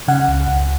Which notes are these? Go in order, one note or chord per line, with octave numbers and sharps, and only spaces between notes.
C#3 F#5
C#2
C#2